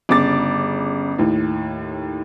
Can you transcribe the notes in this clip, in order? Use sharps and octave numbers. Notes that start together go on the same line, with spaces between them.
G1 C#3 D6 A6
D#2 A2